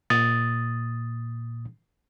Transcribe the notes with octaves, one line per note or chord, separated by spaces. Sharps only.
A#2 D#6 A6